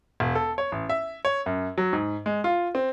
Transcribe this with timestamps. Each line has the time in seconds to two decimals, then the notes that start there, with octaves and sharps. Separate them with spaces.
0.20 E1
0.35 A4
0.58 C#5
0.72 A1
0.89 E5
1.25 C#5
1.46 F#2
1.78 F#3
1.93 G#2
2.26 G#3
2.44 F4
2.75 C4